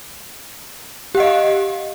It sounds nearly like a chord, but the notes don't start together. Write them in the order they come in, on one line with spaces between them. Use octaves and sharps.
G4 F#5 D#5 F5